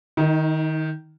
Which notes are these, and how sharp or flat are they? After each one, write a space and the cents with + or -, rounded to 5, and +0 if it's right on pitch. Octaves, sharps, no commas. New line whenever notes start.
D#3 +0 D#4 +35